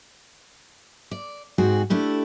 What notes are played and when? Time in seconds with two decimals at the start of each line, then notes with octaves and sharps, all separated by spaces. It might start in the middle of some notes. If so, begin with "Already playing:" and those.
1.11 D5
1.58 G#2 C4 F#4 G#4
1.90 A3 D4 E4 G4